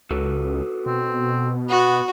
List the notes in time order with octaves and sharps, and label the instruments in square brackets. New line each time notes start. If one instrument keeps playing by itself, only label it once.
[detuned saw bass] C#2 [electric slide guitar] F#4 A4 B4
[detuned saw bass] B2 [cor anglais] C4
[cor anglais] B3 [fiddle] F#4